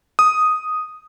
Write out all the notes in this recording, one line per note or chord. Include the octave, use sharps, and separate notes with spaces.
D#6